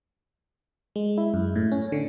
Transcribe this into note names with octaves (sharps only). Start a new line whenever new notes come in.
G#3
E4
F#2
A2
C#4
D3